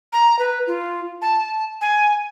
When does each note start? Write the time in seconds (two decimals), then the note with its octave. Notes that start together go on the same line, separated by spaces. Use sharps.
0.13 A#5
0.39 B4
0.67 F4
1.22 A5
1.81 G#5